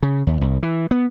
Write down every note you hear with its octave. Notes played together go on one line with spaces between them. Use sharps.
C#3
D#2
C2
E3
B3